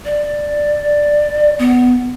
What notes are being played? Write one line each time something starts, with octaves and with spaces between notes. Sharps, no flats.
D5
B3